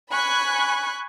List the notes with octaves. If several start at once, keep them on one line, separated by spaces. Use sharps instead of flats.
G#5 B5 C#6 F#6